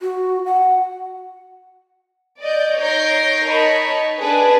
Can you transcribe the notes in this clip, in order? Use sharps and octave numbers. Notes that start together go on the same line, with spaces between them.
F#4
F#5
D5 D#5 G6
D#4 C#5 G6 A#6 C7 D7
D#4 A#4 C#5 D#5 A5 B5
D4 G#4 B4